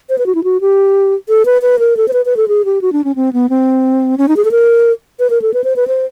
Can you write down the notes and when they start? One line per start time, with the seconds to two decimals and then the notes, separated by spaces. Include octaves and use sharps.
0.10 C5
0.18 B4
0.26 F#4
0.35 E4
0.44 F#4
0.61 G4
1.29 A4
1.46 B4
1.62 B4
1.79 A#4
1.97 A4
2.08 C5
2.13 B4
2.25 B4
2.37 A4
2.48 G#4
2.65 G4
2.82 F#4
2.93 D4
3.04 C#4
3.16 C4
3.33 B3
3.49 C4
4.18 C#4
4.28 D#4
4.37 G#4
4.45 A4
4.51 A#4
5.20 B4
5.30 A#4
5.42 A4
5.54 B4
5.64 C5
5.76 B4
5.88 C5